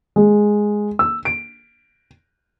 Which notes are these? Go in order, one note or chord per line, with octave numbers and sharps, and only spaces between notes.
G#3
E6
D7